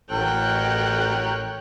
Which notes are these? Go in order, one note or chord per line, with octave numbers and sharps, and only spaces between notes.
A1 F#4 A#4 C#5 G5 F#6